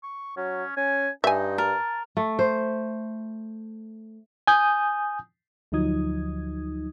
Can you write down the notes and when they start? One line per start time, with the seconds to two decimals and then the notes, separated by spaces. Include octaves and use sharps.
0.03 C#6
0.37 F#3 C#4
0.77 C#4 G#5
1.24 G2 D#4 E5 G#5
1.58 A#4 A5
2.17 A3
2.39 C5
4.47 G#5 D#6 G6
5.72 D2 F3 F#3 D#4 D#6 G#6